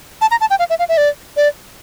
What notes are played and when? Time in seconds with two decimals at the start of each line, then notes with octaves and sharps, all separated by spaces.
0.21 A5
0.31 A#5
0.41 A5
0.50 G5
0.59 F5
0.70 E5
0.79 F5
0.89 E5
0.97 D5
1.37 D5